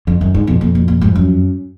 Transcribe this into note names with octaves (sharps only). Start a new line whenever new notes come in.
F2 D3
F#2 D#3
G#2 D3
F2 B2
F2 A#2
A#2
A#2
G#2
F#2